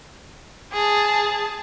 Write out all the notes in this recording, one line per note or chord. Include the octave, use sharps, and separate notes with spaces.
G#4 A5